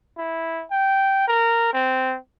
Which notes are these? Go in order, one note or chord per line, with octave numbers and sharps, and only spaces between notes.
E4
G5
A#4
C4